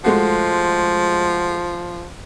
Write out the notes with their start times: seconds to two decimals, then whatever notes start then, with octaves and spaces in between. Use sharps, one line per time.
0.04 F3 G#3 A3 F#4